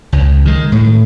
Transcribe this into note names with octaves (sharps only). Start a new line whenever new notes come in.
C#2
D#3 G#3
A2